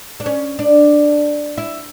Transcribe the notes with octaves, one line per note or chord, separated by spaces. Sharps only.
D4
C#4
D4
E4